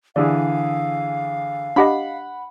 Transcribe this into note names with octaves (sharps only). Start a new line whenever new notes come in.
D3 E3 G#4 D5 F5
D4 G4 D#5 F#5 B5